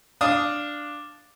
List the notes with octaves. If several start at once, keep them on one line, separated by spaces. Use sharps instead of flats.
D4 F5 D#6